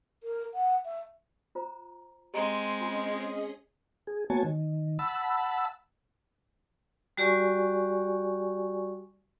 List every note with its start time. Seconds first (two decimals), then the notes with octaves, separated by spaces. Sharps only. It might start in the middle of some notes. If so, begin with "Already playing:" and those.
0.23 A#4
0.54 F#5
0.85 E5
1.55 F4 C5 A#5
2.34 G#3 C4 G4 D#5 A#5
2.81 C#4 F4 G#4 D#5 G#5
4.07 G#4
4.30 A#3 B3 F#4 C#5 G#5 A5
4.44 D#3
4.99 F#5 A5 B5 E6
7.17 G3 F#4 G4 D5 G#5 C#6